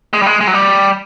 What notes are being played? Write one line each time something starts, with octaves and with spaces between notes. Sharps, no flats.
G#3
G3
G#3
G#3
F#3
G3